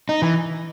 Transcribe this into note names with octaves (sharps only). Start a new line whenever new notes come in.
D#4
E3